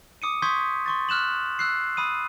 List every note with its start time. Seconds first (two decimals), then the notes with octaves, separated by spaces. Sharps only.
0.22 D6 D#6 C#7 D#7
0.42 C6 C#6 D#6 G6 G#6 B6
0.86 C6 C#6 A6
1.09 F6 F#6 E7 F#7
1.59 E6 F#6 C7
1.97 B5 D#6 D#7